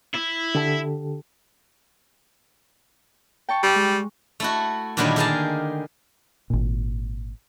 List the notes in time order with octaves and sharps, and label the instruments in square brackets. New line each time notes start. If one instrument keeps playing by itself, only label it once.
[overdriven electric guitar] E4
[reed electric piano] D3 G4 A4
[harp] G5 A5 C#6
[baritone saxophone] G3
[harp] G#3
[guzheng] A3 E4 F#4
A#2 D3 D#3 F#3 G3 E4
G4 G#4 A#4 F5 G#5 A5
[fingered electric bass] G#1 A#2